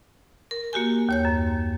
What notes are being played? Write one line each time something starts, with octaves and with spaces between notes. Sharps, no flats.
A#4
A#3 F#4 G4 G#5
D#2 C#5 G6
F#2